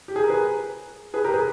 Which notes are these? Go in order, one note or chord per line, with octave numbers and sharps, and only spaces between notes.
G4
G#4
A#4
G#4 B4
G#4 B4
G4 A#4
G#4 B4